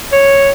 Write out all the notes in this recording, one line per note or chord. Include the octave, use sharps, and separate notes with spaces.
C#5